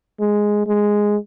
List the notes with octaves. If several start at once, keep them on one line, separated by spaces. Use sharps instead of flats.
G#3
G#3